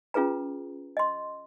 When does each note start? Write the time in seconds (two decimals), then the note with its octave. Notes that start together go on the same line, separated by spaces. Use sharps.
0.14 C#4 F4 G#4 B4 A#5
0.97 D#5 C6